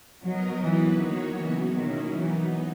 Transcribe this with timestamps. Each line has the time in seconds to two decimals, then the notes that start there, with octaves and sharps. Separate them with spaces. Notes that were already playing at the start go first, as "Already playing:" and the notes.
0.24 F#3 B3 D#4 A#4 D#5
0.62 E3 F#3 B3 E4 B4
0.99 D#3 F#3 A#3 D#4 F#4 C#5
1.37 C#3 E3 F#3 B3 F#4
1.74 B2 D#3 A#3 C#4 E4
2.12 E3 F#3 B3 D#4